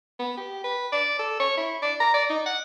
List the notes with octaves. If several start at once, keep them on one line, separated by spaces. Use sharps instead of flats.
B3
G4
B4
D5
A4
C#5
E4
D5
A#5
D5
D#4
F#5